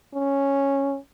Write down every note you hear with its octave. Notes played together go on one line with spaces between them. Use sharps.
C#4